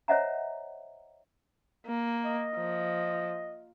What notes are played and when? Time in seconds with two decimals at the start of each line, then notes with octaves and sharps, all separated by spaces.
0.08 C5 C#5 D#5 E5 F#5 A#5
1.86 A#3
2.25 D#5
2.56 F3